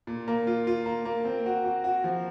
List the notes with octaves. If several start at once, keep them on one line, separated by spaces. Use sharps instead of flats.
A#2
A#3
F4
F4
A#3
A#3
C4
F#4
F#4
F#4
F3